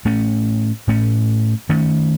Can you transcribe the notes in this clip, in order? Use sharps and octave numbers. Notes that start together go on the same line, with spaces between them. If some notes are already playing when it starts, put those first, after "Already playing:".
A2 A3 C#4
A2 A3 C#4
D#3 A3 C#4